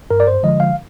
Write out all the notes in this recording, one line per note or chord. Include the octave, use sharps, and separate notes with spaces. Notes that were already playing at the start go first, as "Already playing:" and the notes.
G2 A#4
D5
C5
D3 F3 G#3 D#5
F5